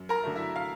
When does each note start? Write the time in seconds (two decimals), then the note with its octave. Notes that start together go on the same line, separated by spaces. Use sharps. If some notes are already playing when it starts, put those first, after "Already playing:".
Already playing: F#2
0.09 A#4 A#5
0.23 D3 F#3 A3
0.36 E4 E5
0.56 F5